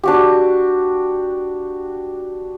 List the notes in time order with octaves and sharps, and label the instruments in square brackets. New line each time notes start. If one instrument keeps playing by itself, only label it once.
[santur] D4 F#4 G4